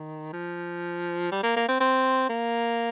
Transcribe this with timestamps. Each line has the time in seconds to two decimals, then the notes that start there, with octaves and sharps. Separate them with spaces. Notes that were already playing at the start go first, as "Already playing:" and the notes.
Already playing: D#3
0.33 F3
1.32 G3
1.43 A#3
1.56 A#3
1.68 C4
1.80 C4
2.29 A#3